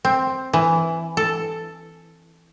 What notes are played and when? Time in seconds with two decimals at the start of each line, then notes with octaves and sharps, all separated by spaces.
0.05 C4
0.53 E3
1.17 A4